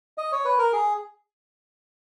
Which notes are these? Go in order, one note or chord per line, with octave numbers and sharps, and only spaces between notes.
D#5
C#5
B4
A#4
G#4